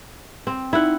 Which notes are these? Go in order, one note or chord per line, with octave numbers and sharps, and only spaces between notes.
C4
D#4 E4 F#5